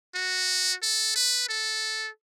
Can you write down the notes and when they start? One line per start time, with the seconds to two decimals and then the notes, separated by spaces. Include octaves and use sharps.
0.15 F#4
0.82 A4
1.15 B4
1.48 A4